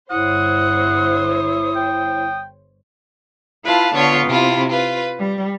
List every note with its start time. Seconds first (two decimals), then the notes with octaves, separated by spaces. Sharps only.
0.11 G1 E4 C5 C#5 F#5 D#6
1.76 G5
3.64 E4 F4 B4 F5 A5
3.95 D3 B3 F4 C#5
4.27 C3 E4 F4
4.70 F4 B4
5.18 G3